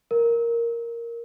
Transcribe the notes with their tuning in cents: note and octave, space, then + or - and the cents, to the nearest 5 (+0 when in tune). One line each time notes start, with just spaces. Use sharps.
A#4 +0